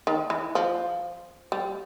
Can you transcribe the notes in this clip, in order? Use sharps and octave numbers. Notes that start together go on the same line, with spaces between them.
D#3
E3
F3
G3